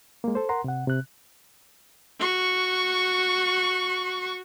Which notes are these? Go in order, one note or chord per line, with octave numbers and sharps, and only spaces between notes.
G#3 A#3
A4 C5
A#4 F#5 A#5 C6
C3 F#5
C3 F#6
F#4 C#6